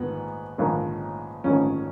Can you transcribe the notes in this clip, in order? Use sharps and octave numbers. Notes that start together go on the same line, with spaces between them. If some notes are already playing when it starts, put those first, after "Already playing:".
Already playing: A#1 G#2 D#3 B3
A#1 G#2 D#3
A#1 G#2 D#3 C#4